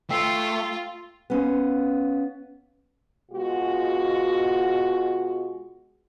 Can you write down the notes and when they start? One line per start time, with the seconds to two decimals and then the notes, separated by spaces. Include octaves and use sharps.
0.10 A3 F4 G5 E6 C7
1.30 B3 C#4 F5
3.31 B2 G#3 F4 F#4